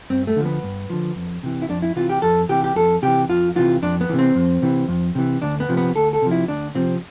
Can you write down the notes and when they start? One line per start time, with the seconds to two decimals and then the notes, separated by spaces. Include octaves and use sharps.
0.10 G2 C4
0.27 A3
0.36 D3 F3
0.46 B3
0.63 G2
0.90 D3 F3
1.16 F2
1.43 C3 E3
1.62 E4
1.69 F2 D4
1.82 E4
1.96 C3 E3 F4
2.10 G4
2.22 F2 A4
2.49 C3 E3 G4
2.64 G4
2.76 F2 A4
3.02 C3 E3 G4
3.29 F2 F4
3.56 C3 E3 F4
3.82 F2 D4
4.01 B3
4.09 C3 E3
4.19 C4
4.36 F2
4.62 C3 E3
4.88 F2
5.15 C3 E3
5.42 D2 D4
5.60 B3
5.69 C3 F3
5.77 B3
5.96 D2 A4
6.13 A4
6.22 C3 F3
6.31 E4
6.48 D2 D4
6.75 C3 F3 C4